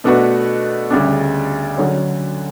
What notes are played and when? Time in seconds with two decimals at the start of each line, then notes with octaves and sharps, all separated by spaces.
0.04 B2 A3 D4 F#4 B4
0.90 D2 C#3 G3 D4
1.77 D3 F#3 C#4